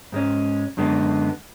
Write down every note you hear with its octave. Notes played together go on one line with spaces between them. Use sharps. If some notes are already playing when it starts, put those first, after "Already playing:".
G#2 G#3 C#4
F#2 D3 G#3 B3